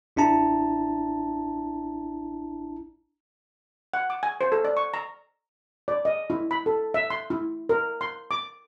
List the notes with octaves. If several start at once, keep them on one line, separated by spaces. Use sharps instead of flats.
A1 D4 E4 A5 A#5
F#5
D6
G#5
C5
A4
D5
C#6
A#5
D5
D#5
E4
B5
A4
E5
C6
E4
A#4
C6
D6